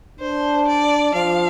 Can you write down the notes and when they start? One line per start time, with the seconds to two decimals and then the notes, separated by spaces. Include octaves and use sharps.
0.20 D4 C5
0.68 D5
1.14 F3 F5